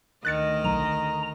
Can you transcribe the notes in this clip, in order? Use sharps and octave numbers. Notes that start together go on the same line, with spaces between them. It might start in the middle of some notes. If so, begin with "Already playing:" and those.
D2 D#3 D#5 F#6 A6 C#7
B1 A#5